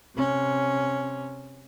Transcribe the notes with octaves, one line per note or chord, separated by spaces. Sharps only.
C3 C#4